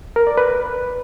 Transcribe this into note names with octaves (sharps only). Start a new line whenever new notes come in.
A#4
D5
B4